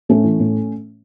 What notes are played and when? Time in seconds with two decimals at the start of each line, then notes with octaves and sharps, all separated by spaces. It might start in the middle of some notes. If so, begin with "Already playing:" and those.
0.09 A2 A3 C#4
0.24 E3
0.39 A2